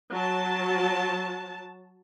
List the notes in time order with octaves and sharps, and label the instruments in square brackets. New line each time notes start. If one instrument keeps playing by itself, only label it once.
[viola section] F#3 A5